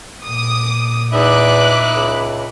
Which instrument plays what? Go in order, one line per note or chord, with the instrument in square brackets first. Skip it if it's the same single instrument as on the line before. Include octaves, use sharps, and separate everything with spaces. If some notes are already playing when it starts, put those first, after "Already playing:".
[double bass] A#2 [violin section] D6 D#6
[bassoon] E2 [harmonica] D#4 E5 B5 [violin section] D6 F#6
[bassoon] C#2